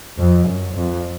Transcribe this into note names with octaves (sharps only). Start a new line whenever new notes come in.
F2
F#2
F2